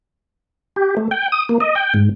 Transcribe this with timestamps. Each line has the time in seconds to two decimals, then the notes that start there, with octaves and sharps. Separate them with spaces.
0.76 G4
0.97 A3
1.11 G5
1.32 D#6
1.49 A#3
1.60 D#5
1.75 G5
1.94 G#2